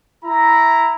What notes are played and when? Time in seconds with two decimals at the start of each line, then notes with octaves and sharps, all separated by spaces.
0.25 E4 A#5